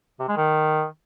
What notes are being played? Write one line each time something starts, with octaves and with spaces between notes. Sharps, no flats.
C3
G#3
D#3